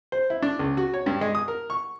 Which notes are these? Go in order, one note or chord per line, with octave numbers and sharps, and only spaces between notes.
C5
E4
D4
C#2
F#4
C#5
G2
G#3
D#6
A#4
C#6